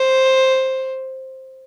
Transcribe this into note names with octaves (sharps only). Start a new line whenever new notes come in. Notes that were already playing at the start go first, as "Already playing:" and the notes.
Already playing: C5